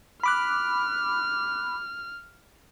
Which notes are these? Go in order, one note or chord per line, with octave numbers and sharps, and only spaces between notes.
B5 D6 F6 F#6